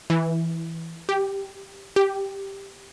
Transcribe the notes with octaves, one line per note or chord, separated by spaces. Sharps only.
E3
G4
G4